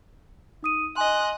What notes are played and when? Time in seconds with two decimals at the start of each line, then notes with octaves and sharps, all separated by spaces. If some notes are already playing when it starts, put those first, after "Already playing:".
0.63 D#4 D#6 D#7
0.96 D#5 G#5 C6 F#6